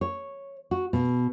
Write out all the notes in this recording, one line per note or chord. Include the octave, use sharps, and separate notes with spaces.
C#5
F#4
B2